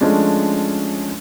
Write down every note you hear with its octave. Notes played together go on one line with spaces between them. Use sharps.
F3 G#3 A3 C#4 D4